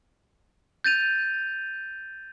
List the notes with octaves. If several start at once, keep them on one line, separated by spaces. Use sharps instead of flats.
G6 A6 D#7 F7